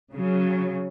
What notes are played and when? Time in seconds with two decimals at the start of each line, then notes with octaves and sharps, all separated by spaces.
0.13 C#3 F#3